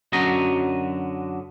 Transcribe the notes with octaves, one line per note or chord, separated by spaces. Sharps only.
F#2 D3 F#3 F#4 D#5 A#5